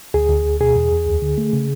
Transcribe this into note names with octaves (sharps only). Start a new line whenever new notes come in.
D2 G#4
D2
D2
B2 G#4
E2
E2
D2
D3
A3
C#3